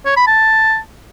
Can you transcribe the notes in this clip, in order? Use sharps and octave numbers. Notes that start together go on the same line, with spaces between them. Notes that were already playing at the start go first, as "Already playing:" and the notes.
C#5
B5
A5